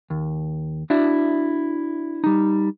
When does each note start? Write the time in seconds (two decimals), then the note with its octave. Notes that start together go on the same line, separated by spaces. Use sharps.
0.10 D#2
0.90 D4 E4 F#4 D5 E5
2.24 G3 D#4